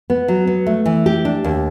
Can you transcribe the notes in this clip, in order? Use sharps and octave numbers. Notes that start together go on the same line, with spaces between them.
B3
F#3
B3
A3
E3
G4
D4
D#2